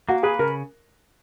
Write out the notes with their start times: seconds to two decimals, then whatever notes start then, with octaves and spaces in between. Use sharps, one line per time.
0.09 A#3 F#4
0.23 G#4 B4
0.39 C#3 A#4